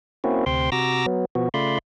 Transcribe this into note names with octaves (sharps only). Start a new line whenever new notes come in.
A#3 C4 C#4 E4 F#4
D2 C3 C5 G5 C6
C3 F#4 A#5 D6 E6 A#6
F#3 B3
B2 F3 B3 F#4
C#3 A3 F4 D5 B5 C6